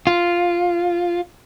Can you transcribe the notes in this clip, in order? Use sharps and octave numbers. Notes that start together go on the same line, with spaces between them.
F4